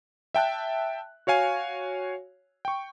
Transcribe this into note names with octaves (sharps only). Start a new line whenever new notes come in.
E5 G5 A5 F#6
F#4 C#5 F5 G#5
G5 C#6